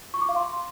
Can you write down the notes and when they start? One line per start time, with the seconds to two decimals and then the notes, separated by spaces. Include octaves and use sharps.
0.14 C#6
0.21 D6
0.29 F5
0.36 C6